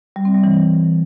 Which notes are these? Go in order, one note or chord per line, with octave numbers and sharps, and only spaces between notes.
G3
C4
G3
E3